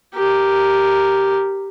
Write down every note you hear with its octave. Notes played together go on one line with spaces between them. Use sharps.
G4 A#4